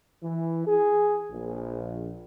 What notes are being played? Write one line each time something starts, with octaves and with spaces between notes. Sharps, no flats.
E3
G#4
A#1